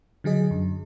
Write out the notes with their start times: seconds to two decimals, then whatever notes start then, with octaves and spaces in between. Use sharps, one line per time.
0.24 D3 F#3 G#4 D#5
0.51 F#2